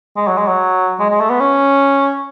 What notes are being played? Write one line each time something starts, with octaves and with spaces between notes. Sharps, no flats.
G#3
F#3
G#3
F#3
G#3
G#3
A3
B3
C#4